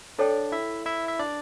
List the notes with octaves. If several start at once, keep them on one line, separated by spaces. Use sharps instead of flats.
D4 A4 C#5 D5 G5
E4 E5
E4 E5
E5
D4 D5